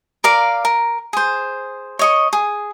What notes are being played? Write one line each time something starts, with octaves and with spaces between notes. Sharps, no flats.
A#4 D5 F5 D6
A#4
G#4 C5
C#5 D#5 C#6
G#4